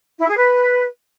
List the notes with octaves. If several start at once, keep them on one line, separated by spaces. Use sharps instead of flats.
E4
G#4
B4